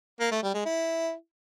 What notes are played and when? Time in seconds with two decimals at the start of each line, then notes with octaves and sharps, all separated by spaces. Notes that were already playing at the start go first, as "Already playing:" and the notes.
0.20 A#3
0.31 A3
0.43 G3
0.54 G#3
0.65 E4